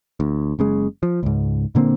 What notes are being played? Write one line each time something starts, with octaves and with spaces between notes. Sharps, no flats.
D2
F#1 C#3 G#3
F3
C#2 G#2
A#2 D3 A#3 C4